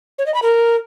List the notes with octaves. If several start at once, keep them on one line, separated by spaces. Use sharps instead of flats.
C#5
D#5
B5
A#4